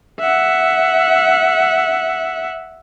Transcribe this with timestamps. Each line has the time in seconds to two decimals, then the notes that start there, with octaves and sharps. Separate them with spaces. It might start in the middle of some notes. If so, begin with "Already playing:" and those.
0.20 E5 F#5